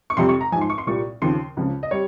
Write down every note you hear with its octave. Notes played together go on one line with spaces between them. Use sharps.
C#6
F2 C3 G3 C6
C#6
A#5
G#2 F3 G#5
C6
C#6
C6
C2 A#2 G3 C#6
D#2 C#3 F3 C6
C#2 C#3 F3
D#5
G3 C#5